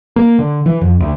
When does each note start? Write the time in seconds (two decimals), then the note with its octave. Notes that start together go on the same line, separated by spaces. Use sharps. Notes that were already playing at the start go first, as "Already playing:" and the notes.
0.16 A#3
0.39 D3
0.66 E3
0.81 F2
1.00 D2